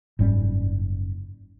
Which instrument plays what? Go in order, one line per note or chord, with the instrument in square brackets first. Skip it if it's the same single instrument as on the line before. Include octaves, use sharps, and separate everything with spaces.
[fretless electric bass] F#1 G#2 G3 C#4